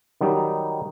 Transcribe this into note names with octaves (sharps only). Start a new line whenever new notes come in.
D#3 F#3 G3 D#4